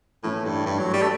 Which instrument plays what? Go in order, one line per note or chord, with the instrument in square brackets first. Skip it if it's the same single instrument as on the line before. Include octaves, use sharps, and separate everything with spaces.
[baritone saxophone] A2 [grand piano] E3 A3 C#4
[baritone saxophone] G2
G2
F#3
G3
A3